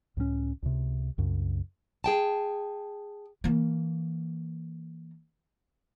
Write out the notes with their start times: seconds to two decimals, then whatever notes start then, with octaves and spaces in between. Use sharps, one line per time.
0.17 C#2 A2 F3 C#4
0.62 C#2 C3
1.18 C2 F#2 C#3
2.04 G#4 G5 A5
3.44 E3 A#3